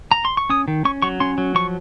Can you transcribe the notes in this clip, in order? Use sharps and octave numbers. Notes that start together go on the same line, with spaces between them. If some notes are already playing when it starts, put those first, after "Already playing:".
A#5
C6
C#6
C#4 D#6
D#3
C#4 C#6
F#3 C#6
C#4 C6
F#3
F3 C#6